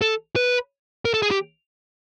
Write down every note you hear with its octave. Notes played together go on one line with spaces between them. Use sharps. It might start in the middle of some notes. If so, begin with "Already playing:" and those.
A4
B4
A#4
A4
G#4
G4